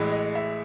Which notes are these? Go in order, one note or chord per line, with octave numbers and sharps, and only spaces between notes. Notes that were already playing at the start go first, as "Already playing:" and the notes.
Already playing: A1 A2 E3 G#3
D#5
E5